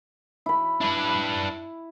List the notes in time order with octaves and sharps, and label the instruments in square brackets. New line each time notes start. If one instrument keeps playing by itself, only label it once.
[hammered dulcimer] E4 B5
[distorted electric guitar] D4 B4 [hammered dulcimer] E4